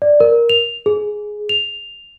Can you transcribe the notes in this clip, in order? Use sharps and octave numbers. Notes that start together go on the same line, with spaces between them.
D5
A#4
F7
G#4
F7